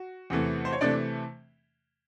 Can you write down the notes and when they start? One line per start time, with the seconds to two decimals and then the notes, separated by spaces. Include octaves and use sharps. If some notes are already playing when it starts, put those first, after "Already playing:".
Already playing: F#4
0.30 E2 C3 E3 A3
0.65 C5
0.72 C#5
0.81 C3 E3 A3 D4 D5